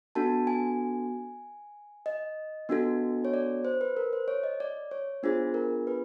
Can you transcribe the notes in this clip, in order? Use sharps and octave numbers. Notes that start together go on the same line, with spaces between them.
B3 D4 F#4 A4 A5
G#5
D#5
B3 D4 F#4 A4
C#5
D5
C5
B4
A#4
C5
C#5
D#5
D5
C#5
B3 D4 F4 G#4 C5
A#4
B4